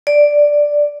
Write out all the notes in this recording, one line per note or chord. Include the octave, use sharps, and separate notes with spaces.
D5